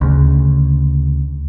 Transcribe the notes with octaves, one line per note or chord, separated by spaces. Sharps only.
D2 C#3